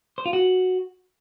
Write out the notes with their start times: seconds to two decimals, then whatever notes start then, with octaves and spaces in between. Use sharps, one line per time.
0.18 C5
0.26 F4
0.33 F#4